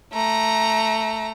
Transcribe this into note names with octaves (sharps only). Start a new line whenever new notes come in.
A3 A#5